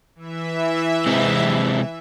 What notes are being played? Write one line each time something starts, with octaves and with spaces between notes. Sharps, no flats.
E3 E5
C3 G#3 C4